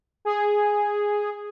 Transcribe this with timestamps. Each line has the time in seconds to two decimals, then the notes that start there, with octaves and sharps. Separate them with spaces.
0.25 G#4